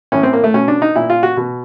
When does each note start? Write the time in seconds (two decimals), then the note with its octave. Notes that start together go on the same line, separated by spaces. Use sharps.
0.12 A2 E3 C#4
0.23 C4
0.33 A#3
0.44 A3
0.54 B2 C#4
0.68 D4
0.82 D#4
0.96 A#2 E4
1.10 F4
1.23 F#4
1.37 B2